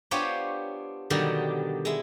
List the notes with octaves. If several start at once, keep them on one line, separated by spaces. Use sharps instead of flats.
B3 D4 F4 G4 C5 C#5
B2 D3 D#3 F#3 G3 G4
G#3 E4